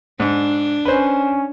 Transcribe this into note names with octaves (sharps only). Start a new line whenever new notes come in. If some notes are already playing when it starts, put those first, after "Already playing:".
G#2 D4
C#4 B4 C5